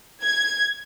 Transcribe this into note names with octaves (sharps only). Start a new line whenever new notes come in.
G#6